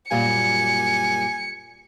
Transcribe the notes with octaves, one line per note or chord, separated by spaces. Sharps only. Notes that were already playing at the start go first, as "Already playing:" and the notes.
F#2 A#2 G3 G#5 C#7